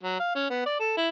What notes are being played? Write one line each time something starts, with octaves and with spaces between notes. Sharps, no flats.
F#3
F5
C#4
B3
D5
A4
E4